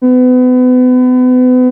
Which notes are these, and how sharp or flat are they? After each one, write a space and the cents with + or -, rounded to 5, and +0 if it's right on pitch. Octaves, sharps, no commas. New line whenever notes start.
B3 +35